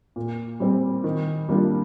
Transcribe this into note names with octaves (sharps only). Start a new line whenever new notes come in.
A#2
G3 C4
D#3
G3 A#3 D4 F4